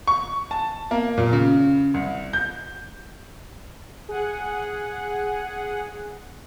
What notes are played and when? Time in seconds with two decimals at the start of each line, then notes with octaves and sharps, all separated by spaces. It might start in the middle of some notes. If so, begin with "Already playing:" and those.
0.07 C#6
0.51 A5
0.91 A#3
1.18 A#2
1.33 C#3
1.94 C2
2.33 G6
4.09 G#4 F#5